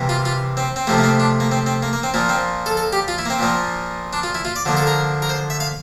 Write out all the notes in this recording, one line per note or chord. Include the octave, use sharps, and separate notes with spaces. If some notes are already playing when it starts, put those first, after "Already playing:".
Already playing: C3 E3 G3 A#3
F4
F4
C4
C4
C3 F3 A3 A#3
A#3
C4
D4
A#3
C4
C4
A#3
A#3
C4
A#2 F3 A#3
C4
A4
A4
G4
F4
E4
A#3
C4
A#2 F3 A#3
D4
F4
E4
F4
D5
D3 F3 A#3
A4
A#4
A#4
C5
E5
F5